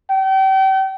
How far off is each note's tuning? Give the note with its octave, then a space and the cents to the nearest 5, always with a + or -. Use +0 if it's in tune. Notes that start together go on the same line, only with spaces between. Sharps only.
G5 -35